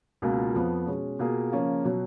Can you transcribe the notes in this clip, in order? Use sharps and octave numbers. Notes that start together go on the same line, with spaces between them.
C#2 B2 A#3 F4
F2 F3 B3
B2 G#3 C#4
B2 A#3 F4 G#4
C#3 F3 A#3 C#4 F4
B2 F#3